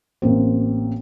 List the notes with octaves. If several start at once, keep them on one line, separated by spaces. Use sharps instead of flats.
A1 A#3 C4